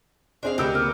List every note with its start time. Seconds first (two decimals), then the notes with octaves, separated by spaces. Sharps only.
0.43 C4 D4 G#4 C5 D#5 F5
0.58 D2 G4 A#4 B4 E6 C#7
0.75 A#3 F6